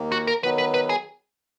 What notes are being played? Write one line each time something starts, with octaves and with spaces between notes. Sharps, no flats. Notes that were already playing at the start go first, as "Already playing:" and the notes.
Already playing: D#2 D#3 A#3
F#4
A#4
D#3 F#3 B3 B4
B4
B4
G#4